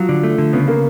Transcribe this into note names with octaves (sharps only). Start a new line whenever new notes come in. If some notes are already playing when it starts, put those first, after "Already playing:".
Already playing: F3 F#3
D3
A3
D3
C#3 B3
A#3